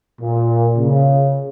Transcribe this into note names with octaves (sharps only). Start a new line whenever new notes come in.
A#2
C#3